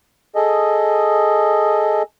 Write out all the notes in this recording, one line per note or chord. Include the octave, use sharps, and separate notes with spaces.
G#4 A4 D#5